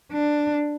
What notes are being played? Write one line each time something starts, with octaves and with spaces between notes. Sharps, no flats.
D4